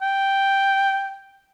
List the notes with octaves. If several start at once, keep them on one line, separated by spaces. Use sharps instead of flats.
G5